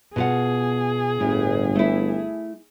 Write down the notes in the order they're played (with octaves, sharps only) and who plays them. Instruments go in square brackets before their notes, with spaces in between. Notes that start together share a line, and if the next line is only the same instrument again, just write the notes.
[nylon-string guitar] B2 F4 F#5 [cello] G#4
[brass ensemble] G1 [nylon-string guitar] A2
[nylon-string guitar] A3 E4